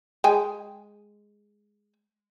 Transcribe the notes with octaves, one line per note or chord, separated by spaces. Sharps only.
G#3 G5 G#5